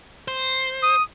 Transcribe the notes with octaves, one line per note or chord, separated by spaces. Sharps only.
C5
D#6